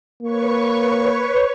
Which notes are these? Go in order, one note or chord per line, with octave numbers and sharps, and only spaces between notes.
A#3 B4 C#5 C#6